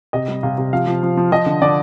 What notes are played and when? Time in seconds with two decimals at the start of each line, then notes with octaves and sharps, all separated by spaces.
0.13 C3 D#5
0.28 G3
0.43 C3 F5
0.58 C3
0.73 F3 F5
0.87 F3
1.03 F3
1.17 F3
1.32 F3 D#5
1.46 D3
1.62 D3 D5